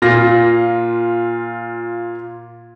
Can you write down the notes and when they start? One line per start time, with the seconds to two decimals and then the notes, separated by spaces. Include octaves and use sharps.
0.02 A#2 F4 A#6